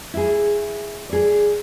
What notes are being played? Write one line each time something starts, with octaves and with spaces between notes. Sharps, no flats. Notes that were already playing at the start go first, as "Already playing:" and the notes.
E4 G#4
G#4 D5